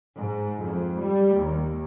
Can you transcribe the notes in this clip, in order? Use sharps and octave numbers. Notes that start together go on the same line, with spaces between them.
G#2
F2
G3
D#2